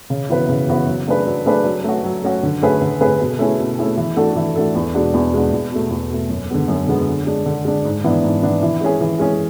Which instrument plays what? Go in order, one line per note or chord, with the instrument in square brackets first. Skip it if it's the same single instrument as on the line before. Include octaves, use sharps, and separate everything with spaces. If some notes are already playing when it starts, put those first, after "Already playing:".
[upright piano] C#3
E3 B3 F#4 B4
C#3
E3 B3 F#4 B4
F#3
A3 D4 G#4 B4
F#3
A3 D4 G#4 B4
F#3
A3 C#4 F#4
F#3
A3 C#4 F#4
D3
A3 C#4 G#4 B4
D3
A3 C#4 G#4 B4
B2
A3 C#4 E4 G#4
B2
A3 C#4 E4 G#4
E3
A3 D4 F#4 A4
E3
A3 D4 F#4 A4
E2
B2 G#3 D4 F#4
E2
B2 G#3 D4 F#4
E2
B2 A3
E2
B2 A3
F#2
D3 G#3 B3
F#2
D3 G#3 B3
D3
G#3 D4
D3
G#3 D4
G#2
E3 B3 D4
G#2
E3 B3 D4
E3
G#3 C#4 G#4
E3
G#3 C#4 G#4